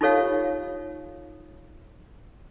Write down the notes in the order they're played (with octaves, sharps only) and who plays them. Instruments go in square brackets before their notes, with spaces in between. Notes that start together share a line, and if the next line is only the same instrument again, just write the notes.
[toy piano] D#4 F4 G4 A4 C#5 F5